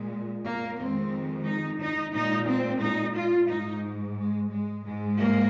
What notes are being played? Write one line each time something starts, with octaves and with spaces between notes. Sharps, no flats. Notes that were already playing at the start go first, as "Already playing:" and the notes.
Already playing: A#2 G#3
A#3
F2 D#3 G#3 C4
D#4
D#4
A#2 G#3 D#4
C4
D#4
F4
G#2 G#3 D#4
G#3
G#3
G#2 G#3
A#3